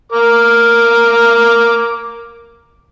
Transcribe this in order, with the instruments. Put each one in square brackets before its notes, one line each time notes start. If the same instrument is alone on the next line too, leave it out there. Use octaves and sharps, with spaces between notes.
[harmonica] A#4 D6